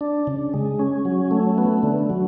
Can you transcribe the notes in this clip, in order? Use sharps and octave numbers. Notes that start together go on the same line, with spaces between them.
D4
C#3
G#3
C#4
F#3
A3
B3
D3
F#3